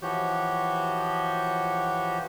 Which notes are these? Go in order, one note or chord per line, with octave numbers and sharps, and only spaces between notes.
E3 F3 F#4 G4 C#5 G6